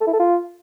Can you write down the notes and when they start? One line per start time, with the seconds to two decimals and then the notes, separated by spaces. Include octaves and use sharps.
0.01 A4
0.07 E4
0.13 A4
0.19 F4